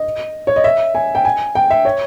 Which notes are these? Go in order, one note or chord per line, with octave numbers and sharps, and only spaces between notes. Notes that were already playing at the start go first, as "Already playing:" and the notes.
Already playing: D#5
C#5
D#5
E5
G#5
G5
G#5
G5
E5
C#5